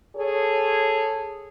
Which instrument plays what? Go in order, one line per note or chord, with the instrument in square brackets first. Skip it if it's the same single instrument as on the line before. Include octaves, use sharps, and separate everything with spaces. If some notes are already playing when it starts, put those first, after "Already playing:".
[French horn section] G#4 A4 C#5